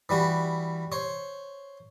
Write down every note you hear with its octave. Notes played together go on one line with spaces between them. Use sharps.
E3 G3 F#4
C5 C#5